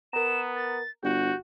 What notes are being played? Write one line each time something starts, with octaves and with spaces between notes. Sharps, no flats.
B3 A#4 A#5 E7
A6
G1 F#4 G4 G6